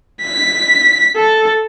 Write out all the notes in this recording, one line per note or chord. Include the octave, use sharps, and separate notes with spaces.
B6
A4